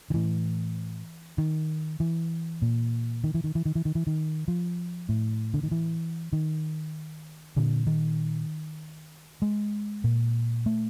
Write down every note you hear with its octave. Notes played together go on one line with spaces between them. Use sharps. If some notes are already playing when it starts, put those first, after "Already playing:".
D#3
A2 E3
D#3
E3
A#2
D#3
E3
D#3
E3
D#3
E3
D#3
E3
D#3
F3
A2
D3
D#3
E3
D#3
A#2 D3
D#3
G#3
A#2
A3